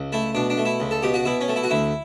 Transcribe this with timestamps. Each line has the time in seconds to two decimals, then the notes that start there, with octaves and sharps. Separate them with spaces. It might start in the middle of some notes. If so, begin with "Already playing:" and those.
Already playing: C#2
0.12 A3 E4
0.35 B2 D4
0.50 D4
0.57 A3
0.65 E4
0.80 C#2
0.91 A4
1.03 B2 G4
1.14 F#4
1.25 B2 E4
1.41 C#4
1.48 A3
1.56 E4
1.63 F#4
1.70 D2 E4